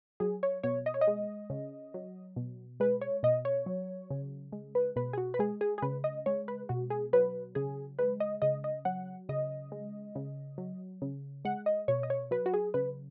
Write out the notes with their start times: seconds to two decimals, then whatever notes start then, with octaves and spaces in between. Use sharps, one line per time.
0.20 F#3 G#4
0.43 C#5
0.63 B2 C#5
0.86 D#5
0.94 C#5
1.01 D#5
1.07 G#3
1.50 C#3
1.94 F#3
2.36 B2
2.80 G#3 B4
3.01 C#5
3.23 B2 D#5
3.45 C#5
3.66 F#3
4.10 C#3
4.52 G#3
4.75 B4
4.96 B2 B4
5.13 G#4
5.18 F#4
5.34 B4
5.39 G#3 G#4
5.61 G#4
5.78 G#4
5.82 C#3 B4
6.04 D#5
6.26 G#3 C#5
6.48 B4
6.69 B2 F#4
6.90 G#4
7.13 F#3 B4
7.55 C#3 G#4
7.99 G#3 B4
8.20 D#5
8.42 C#3 D#5
8.64 D#5
8.85 F#3 F#5
9.29 C#3 D#5
9.72 G#3
10.15 C#3
10.58 F#3
11.02 C#3
11.45 G#3 F#5
11.66 D#5
11.88 B2 C#5
12.03 D#5
12.10 C#5
12.31 F#3 B4
12.46 F#4
12.54 G#4
12.74 C#3 B4